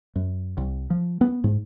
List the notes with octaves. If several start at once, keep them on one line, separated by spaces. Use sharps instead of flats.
F#2
C2
F3
B3
G#2